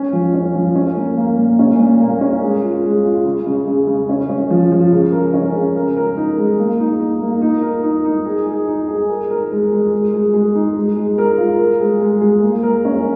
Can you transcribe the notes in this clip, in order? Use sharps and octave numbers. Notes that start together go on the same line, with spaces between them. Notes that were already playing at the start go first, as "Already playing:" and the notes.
Already playing: C#4
F3
C#4
F3
C#4
A#3
A#3
A#2
C#4
A#2
A#3
C#4
G#3
F4
G#3
F4
C#3
C#3
C#3
C#3
C#4
C#4
F3
F3
C#3
A#4
C#4
C#3
A#4
A#4
D#4
G#3
A#3
D#4
D#4
A#3
D#4
A#4
D#4
D#4
G#4
G#4
D#4
G#4
A#4
A#4
G#3
G#3
G#3
G#3
G#3
D#4
G#3
G#3
A#4
F4
A#4
G#3
G#3
G#3
A#3
A#4
C#4